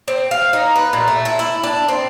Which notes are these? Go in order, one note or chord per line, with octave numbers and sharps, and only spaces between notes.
C4
F5
D#4
B4
A#2
A3
E4
E4
D4
C4